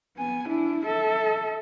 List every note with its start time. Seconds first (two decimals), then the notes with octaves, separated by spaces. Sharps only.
0.17 B3 G#5
0.48 D4 E4
0.86 A4 E5